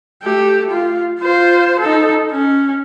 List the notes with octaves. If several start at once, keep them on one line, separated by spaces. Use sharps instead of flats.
A3 G4
F4
F4 C5
D#4 A4
C#4